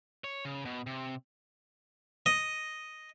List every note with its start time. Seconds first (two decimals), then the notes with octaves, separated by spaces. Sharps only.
0.24 C#5
0.45 C#3
0.65 B2
0.87 C3
2.26 D#5